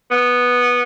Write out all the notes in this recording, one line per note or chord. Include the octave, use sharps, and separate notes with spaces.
B3